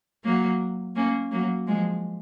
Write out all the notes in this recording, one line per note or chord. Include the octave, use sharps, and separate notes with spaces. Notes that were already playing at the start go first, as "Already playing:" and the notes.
F#3 A#3
A#3 C#4
F#3 A#3
F3 G#3